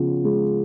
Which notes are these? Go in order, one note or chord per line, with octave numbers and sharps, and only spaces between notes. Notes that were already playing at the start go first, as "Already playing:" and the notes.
Already playing: C#3 F3 B3
G#3